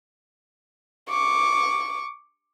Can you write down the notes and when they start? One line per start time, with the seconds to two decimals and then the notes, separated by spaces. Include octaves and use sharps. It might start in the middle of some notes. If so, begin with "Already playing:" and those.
1.09 C#6 D6